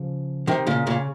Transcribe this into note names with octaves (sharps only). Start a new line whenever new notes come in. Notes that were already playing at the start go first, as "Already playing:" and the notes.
Already playing: C#3 F3
C3 D#3
A#2 C#3
A#2 C#3